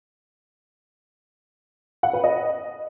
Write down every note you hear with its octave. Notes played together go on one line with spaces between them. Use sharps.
F#5
B4
D#5